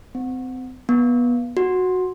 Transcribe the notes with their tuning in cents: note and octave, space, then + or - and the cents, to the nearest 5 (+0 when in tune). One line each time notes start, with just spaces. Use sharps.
C4 -30
B3 -25
F#4 -5